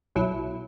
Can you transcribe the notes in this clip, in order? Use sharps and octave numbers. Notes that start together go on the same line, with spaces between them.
B1 B2 F#3 E4